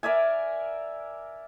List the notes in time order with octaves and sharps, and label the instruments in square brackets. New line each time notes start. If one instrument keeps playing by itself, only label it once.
[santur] A#4 D5 E5 G#5